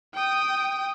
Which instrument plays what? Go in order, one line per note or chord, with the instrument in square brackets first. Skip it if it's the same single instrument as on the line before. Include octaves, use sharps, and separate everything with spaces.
[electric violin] G5 D#6